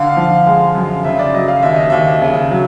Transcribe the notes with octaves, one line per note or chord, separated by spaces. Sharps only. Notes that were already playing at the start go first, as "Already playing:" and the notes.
Already playing: D3 F5
F3
G#3
F#2
C#3 E5
D5
F#3 D#5
F5
D#2 E5
D#5
D#2 E5
C#3
F#3